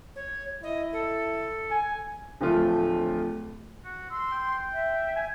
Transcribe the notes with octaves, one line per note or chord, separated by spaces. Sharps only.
C#5
E4 D#5
A4
G#5
D1 F3 A3 F4
F#4
C6 E6
G5
E5
G#5